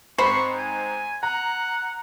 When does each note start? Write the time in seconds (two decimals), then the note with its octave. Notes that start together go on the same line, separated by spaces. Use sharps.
0.18 G#2 C4 C5 B5 C#6 C7
0.58 G#5
1.23 F#5 A#5